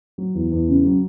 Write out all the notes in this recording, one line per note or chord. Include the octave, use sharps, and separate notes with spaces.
F#3
E2
E2
C#3
F#3